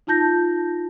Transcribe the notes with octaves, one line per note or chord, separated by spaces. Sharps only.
D#4 F4 A5 G6 A#6